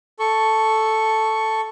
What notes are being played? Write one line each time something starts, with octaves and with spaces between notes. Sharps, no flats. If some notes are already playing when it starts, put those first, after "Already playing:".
A4 C#6